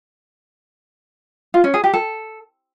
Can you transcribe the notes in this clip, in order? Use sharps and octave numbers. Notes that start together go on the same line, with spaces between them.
F4
C#4
G#4
G4
A4